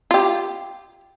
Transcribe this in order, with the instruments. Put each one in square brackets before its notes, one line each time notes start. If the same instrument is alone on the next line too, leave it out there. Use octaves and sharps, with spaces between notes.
[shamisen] F4 G4